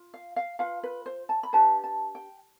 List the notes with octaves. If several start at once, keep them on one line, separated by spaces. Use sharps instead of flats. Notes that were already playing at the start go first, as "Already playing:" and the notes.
Already playing: F4
F5
F5
F4 B4 F5
B4
C5
A5
B5
D4 G4 B4 A5
A5
G5